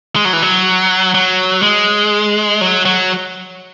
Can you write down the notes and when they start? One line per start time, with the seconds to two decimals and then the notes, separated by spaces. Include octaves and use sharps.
0.16 G#3
0.25 F#3
0.33 E3
0.42 F#3
1.15 F#3
1.62 G#3
2.61 F#3
2.86 F#3